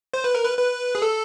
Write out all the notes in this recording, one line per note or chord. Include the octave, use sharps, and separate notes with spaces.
C5
B4
A#4
B4
B4
G#4
A4